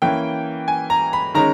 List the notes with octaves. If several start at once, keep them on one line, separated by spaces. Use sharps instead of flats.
E3 A#3 C#4 G5
G#5
A#5
B5
D#3 G#3 C#4 A#5